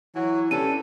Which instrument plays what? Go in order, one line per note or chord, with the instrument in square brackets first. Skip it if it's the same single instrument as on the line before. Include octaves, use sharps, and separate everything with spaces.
[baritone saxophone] E3 [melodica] F#3 F#4
[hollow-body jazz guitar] C#4 D4 B4 [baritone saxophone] G4 [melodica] A4 [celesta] D#7